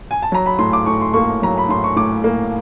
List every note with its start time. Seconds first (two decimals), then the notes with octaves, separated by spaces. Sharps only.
0.11 G#5
0.22 A5
0.32 F#3 A#5
0.46 B5
0.59 A2 C6
0.73 D6
0.86 A2 C#6
1.01 C6
1.14 A#3 C#6
1.42 F#3 A#5
1.58 B5
1.69 A2 C6
1.84 C#6
1.96 A2 D6
2.24 A#3